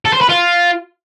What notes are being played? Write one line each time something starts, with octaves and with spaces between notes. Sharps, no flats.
A4
C5
B4
F4